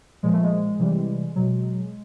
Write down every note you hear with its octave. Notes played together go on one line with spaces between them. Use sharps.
A#2 F3 G#3
A3
G#3
C3 E3 G3
B2 F#3